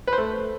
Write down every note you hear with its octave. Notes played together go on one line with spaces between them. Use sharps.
B4
C5
A3